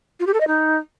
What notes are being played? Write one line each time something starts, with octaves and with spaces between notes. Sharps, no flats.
F4
G4
A4
D#5
D#4